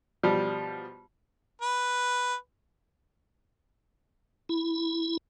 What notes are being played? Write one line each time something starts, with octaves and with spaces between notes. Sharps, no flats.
B2 F3 G3
B4
E4